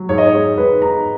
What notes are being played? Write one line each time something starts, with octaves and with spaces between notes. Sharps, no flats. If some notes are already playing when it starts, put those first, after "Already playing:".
Already playing: F#3
G#2 C#5
D#5
C#5
G#3
G#2 B4
G#2 A#5